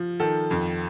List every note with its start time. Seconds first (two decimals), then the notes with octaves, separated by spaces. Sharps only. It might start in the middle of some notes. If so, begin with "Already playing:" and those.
Already playing: F3
0.20 D#3 A4
0.51 F2